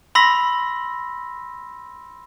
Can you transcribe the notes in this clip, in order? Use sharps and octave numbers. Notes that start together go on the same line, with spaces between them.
B5 C6 E6 A#6 B6